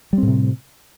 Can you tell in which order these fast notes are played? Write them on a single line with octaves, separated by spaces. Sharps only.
G3 C4 A2 C3